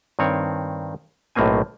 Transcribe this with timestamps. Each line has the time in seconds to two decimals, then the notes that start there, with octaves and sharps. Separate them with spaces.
0.19 G2 D#3 C4 C#5
1.35 B1 A2 A3 A#3 C4 G#5